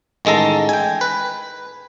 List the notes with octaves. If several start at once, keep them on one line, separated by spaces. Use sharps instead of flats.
A1 D#3 G#3 A4 A#5
G5 G#5
B4